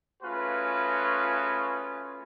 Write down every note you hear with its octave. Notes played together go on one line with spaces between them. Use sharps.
A3 C#4 F4 F#4 G#4 B4